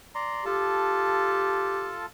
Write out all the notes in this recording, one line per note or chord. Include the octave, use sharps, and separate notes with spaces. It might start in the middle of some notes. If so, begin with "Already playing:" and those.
D5 A#5 C6
F4 G4 A4 A5